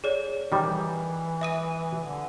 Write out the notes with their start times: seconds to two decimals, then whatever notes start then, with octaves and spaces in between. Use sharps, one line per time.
0.04 G#4 C#5 D5
0.52 D#3 E3 G3
1.41 E5 D#6 D#7
2.04 D3